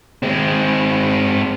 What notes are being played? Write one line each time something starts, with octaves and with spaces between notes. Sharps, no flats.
G#3 C4